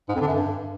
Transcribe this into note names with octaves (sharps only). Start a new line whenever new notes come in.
G#2
F2
D3
F#2
G2